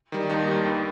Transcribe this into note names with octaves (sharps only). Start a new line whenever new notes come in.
D#3 G3
D#2 D#4
D#3 G3
G2